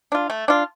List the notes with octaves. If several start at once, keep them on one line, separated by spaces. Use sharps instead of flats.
D4 F4
A3
D4 F4